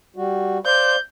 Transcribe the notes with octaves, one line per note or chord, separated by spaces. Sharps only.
G3 F#4
C5 D5 F5 G6